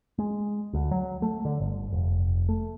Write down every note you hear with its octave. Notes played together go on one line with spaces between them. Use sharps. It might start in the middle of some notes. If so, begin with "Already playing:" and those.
G#3
D2
F#3
A3
D3
G1
F1
A3